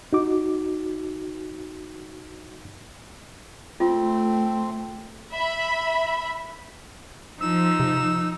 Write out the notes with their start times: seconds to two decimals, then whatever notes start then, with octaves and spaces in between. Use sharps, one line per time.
0.13 D#4 F#4 D6
3.80 A3 C4 F4
5.33 E5 B5
7.40 F3 D#4 E6
7.80 C3